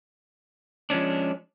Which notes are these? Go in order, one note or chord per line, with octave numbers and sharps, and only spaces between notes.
F3 G#3 C#4 D4